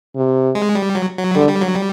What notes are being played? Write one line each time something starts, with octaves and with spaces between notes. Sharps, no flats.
C3
G#3
G3
F#3
F#3
D3 G3
G3
F#3
G3